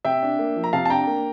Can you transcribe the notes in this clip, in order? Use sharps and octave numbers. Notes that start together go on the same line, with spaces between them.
C3 E5 G5
D4
A#3
F3
A#5
C3 F5 A5
A5
D4 G5 A#5
A#3